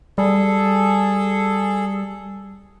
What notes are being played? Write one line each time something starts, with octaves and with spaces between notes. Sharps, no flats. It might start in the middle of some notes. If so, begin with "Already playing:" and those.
G3 G#4 A4